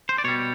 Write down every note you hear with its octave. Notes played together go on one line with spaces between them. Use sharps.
C5
D5
B2 G3 C#5